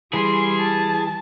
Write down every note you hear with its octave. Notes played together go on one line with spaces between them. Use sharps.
E3 G3 G#4 C6
A5